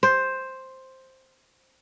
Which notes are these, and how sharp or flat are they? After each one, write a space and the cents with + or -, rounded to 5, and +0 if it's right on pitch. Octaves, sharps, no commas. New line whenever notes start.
C5 +5